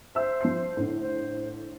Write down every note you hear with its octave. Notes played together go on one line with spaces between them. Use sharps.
C5 E5 E6
F3 C6 C7
A2 D3
C5